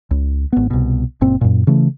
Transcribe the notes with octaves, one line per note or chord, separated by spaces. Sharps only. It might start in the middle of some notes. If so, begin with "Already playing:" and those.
C#2
G#1 B3
C2 B2
F#1 A#2 C4
F#2 A#2
C#3 E3 A3